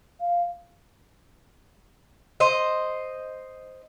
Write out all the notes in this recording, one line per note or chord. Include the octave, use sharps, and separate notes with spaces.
F5
C5 D#5